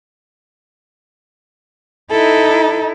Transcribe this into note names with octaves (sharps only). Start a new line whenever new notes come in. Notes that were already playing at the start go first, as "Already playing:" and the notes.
D#4 E4 A4